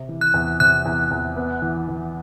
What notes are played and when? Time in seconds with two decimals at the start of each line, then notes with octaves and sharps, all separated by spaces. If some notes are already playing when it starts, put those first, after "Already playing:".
Already playing: C3
0.09 E3
0.21 F#6
0.34 E2
0.60 C3 F#6
0.85 E2
1.11 E2
1.37 B3
1.62 E3
1.88 E3